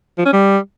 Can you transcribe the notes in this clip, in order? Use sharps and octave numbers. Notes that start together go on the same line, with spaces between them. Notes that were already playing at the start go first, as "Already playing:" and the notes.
F3
C#4
G3